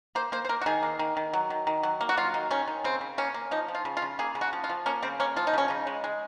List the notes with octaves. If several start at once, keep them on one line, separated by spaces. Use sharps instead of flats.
A#3 C5
A#3 C5
C5
A#3 A#4
F#4
D#3 G#4
A#3
D#3
D#3
F#3
D#3
D#3
F#3
A#3
F#4
F#3 F4
D#3
D#3 C#4
D#3
C#3 C4
C#3
A#3 C#4
A#3
F3 D#4
F3
F4
C#3
F4
C#3
A#3 G#4
C#3
F#4
F3
F4
F3
A#3 C#4
C#3 C4
A#3 C#4
F3 F4
D#4
C#3 C#4
C#3 D#4
G#3
G#3